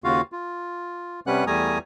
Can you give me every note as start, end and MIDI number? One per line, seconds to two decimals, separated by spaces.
0.04 0.21 39
0.04 0.21 49
0.04 0.21 65
0.04 0.21 66
0.04 0.21 77
0.32 1.20 65
1.27 1.45 48
1.27 1.45 55
1.27 1.45 61
1.27 1.45 71
1.27 1.45 78
1.27 1.45 90
1.47 1.78 40
1.47 1.78 55
1.47 1.78 57
1.47 1.78 80
1.47 1.78 82
1.47 1.78 87